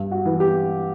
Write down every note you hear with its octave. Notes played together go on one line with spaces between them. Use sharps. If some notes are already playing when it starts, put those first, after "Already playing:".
Already playing: G2
F#4
E3
G4